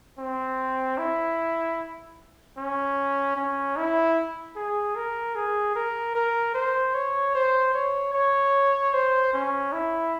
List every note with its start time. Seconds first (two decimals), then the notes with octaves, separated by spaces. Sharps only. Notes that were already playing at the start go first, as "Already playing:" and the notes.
0.19 C4
0.98 E4
2.57 C#4
3.36 C#4
3.77 E4
4.56 G#4
4.96 A#4
5.36 G#4
5.76 A#4
6.15 A#4
6.54 C5
6.94 C#5
7.35 C5
7.74 C#5
8.14 C#5
8.94 C5
9.33 C#4
9.73 E4